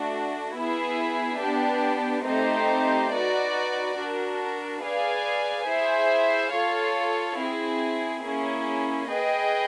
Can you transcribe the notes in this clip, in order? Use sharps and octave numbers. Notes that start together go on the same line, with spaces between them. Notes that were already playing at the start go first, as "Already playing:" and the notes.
Already playing: A3 D4 F#4
B3 E4 G#4 B4 E5
B3 D4 G4
A3 C4 D#4 G4 C5
D#4 F#4 B4 D5
D4 F#4 A#4
G#4 B4 D5 F5 G#5
E4 G#4 C5 E5
F4 A4 C#5 F5
C4 E4 G#4
A#3 C#4 E4 G#4
G#4 B4 D#5 G5